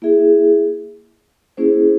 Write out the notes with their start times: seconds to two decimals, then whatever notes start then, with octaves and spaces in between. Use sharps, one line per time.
0.02 A#3 E4 G#4 E5
1.57 A#3 C#4 E4 G#4 C5